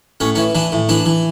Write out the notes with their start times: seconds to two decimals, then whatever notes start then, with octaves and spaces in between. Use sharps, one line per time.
0.20 A2 C#4
0.35 E3 C#4
0.55 E3 D4
0.72 A2
0.89 E3 D4
1.06 E3